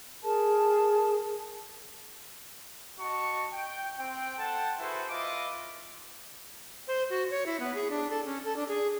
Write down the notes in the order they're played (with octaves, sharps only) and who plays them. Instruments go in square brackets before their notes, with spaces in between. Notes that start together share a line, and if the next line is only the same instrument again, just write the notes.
[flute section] G#4 A#4 A5
[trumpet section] F#4 D#5 A5 C#6
G5
C4 G5
A4 C5 F#5 G5 A5
E4 F#4 G#4 A4 B4 C5
F4 B4 D#5 E5 D6
[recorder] C5
F#4
C#5
E4
B3
G#4
D4
A4
C#4
A4
D4
G#4